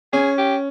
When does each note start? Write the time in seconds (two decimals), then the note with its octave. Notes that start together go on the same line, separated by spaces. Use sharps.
0.13 C#4 G#4
0.38 G4